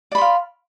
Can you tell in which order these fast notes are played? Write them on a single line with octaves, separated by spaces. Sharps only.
D5 B5 C6 F5